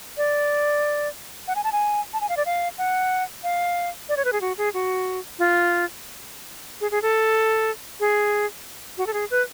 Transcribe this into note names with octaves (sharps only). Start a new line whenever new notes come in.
D5
F#5
G#5
A5
G#5
A5
G#5
F5
D5
F5
F#5
F5
D5
C#5
B4
G#4
F#4
G#4
F#4
F4
G#4
G#4
A4
G#4
F#4
A4
G#4
B4